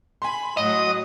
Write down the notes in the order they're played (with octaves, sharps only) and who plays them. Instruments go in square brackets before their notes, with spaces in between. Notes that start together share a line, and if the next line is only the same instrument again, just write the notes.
[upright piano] G#5 C6 [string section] B5
[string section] A2 F#3 [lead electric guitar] D#5 [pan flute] D#6